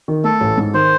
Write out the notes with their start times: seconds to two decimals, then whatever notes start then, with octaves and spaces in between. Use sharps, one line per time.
0.08 D#3
0.24 A3 A4
0.41 A1
0.57 G#2
0.74 D#3 C5